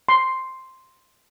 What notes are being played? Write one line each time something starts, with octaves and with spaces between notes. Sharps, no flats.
C6